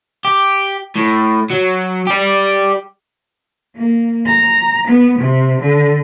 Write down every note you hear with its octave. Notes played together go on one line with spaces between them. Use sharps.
G4
A2
F#3
G4 D5
A#3
A#5
B3
C3
D3